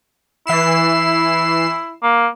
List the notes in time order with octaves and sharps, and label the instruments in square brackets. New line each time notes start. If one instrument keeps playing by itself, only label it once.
[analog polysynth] E3 C7 E7 [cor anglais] E4
[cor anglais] A#3